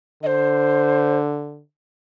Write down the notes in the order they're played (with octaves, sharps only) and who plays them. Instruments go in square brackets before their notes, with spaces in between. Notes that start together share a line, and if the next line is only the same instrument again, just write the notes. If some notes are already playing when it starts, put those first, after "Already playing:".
[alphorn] D3 [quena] C5 D#5